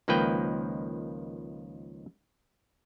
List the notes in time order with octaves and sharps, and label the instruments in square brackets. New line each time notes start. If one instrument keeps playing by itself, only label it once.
[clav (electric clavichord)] C#2 D#3 F3 A#3 B4 G5